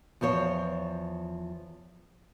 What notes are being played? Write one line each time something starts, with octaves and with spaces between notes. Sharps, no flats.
E2 F3 C5 C#5